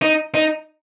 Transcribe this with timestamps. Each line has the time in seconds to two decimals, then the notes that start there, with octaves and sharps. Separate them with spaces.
0.02 D#4
0.35 D#4